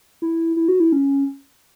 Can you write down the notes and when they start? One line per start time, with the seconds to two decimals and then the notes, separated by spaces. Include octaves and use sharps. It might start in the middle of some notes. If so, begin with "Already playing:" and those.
0.22 E4
0.56 E4
0.68 F#4
0.80 E4
0.92 C#4